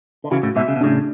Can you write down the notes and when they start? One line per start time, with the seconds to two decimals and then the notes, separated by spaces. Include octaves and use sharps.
0.24 D3
0.31 C#3 E3 F#4
0.43 A2 C#3
0.56 G#2 B2 E5
0.68 C#3
0.76 B2
0.81 A2 C#3 D4